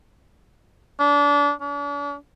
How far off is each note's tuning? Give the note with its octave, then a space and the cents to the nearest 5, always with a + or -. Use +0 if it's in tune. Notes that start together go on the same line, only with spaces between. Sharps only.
D4 -30
D4 -40